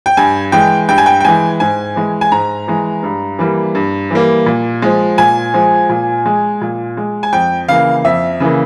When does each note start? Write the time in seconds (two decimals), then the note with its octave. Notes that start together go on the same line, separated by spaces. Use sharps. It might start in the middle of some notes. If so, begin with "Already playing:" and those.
0.06 G5
0.17 G2 G#5
0.52 E3 G#3 G5
0.89 G2 G5
0.98 G#5
1.06 G5
1.20 G5
1.25 E3 G#3 G#5
1.60 G#2 G#5
1.96 E3 G#3
2.21 G#5
2.32 G#2 A#5
2.68 E3 G#3
3.03 G2
3.39 E3 G3 A#3
3.75 G2
4.11 E3 G3 A#3
4.46 A#2
4.82 F3 G#3
5.18 A#2 G#5
5.54 F3 G#3
5.89 A#2
6.26 G#3
6.61 A#2
6.97 G#3
7.23 G#5
7.32 F2 G5
7.68 C#3 E3 A#3 F5
8.04 F2 E5
8.40 C#3 E3 A#3